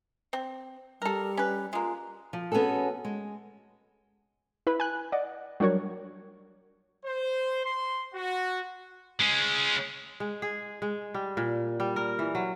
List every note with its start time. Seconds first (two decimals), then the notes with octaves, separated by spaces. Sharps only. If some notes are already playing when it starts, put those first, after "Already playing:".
0.33 C4
1.02 G3 A4 A#4
1.37 C#4 B4
1.73 G#3 A#3 F4
2.33 F3
2.52 B3 C#4 F#4 G#4 A4
3.05 G#3
4.67 E4 B4 B5
4.80 G#5 F#6
5.12 D5 D#5 F#5
5.60 F#3 G3 D4 F#4 A#4 C#5
7.05 C5
7.65 C6
8.13 F#4
9.21 G#3 C#4
10.20 G#3
10.42 G#4
10.82 G#3
11.14 G3
11.37 A#2
11.80 G3
11.96 A#4
12.19 E3
12.35 F#3